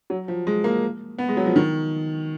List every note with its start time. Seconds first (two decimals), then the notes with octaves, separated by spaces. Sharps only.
0.10 F#3
0.28 F3
0.47 G#3
0.64 A#3
1.18 B3
1.29 G#3
1.37 F#3
1.46 F3
1.56 D#3